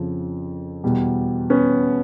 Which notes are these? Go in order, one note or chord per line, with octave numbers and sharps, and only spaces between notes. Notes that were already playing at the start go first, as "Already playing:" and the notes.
Already playing: F2 C#3 F3
E2 B2 G3
B3 C#4